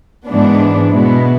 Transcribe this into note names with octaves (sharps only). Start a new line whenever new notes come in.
G#2 E3 B3 D4
B2 G#3 B3 E4